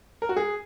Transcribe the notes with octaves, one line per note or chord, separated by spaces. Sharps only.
A#4
F#4
G#4